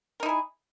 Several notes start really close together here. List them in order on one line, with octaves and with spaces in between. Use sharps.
A#4 D#4 E4 G#4